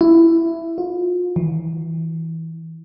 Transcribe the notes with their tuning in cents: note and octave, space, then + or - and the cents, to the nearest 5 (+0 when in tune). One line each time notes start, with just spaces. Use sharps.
E4 +10
F4 +35
E3 -20